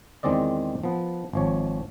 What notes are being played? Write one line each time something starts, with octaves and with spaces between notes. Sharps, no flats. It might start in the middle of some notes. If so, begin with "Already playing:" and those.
E2 D#3 G#3 C4 D5 D#5
F3 B3
G#1 F3 C#5